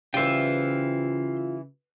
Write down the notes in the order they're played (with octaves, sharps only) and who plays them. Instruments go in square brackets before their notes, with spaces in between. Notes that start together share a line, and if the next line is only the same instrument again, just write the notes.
[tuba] C#3 [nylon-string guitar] E3 G3 [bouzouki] F4 E5 [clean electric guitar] C5 G5